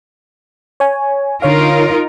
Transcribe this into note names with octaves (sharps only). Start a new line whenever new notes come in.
C#5 G#5
D3 D#4 F4 A#4 C#5 F5